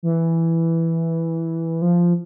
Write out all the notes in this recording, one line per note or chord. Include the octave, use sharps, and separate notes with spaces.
E3
F3